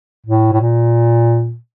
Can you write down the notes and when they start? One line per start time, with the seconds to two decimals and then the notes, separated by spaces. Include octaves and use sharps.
0.26 A2
0.53 A2
0.61 A#2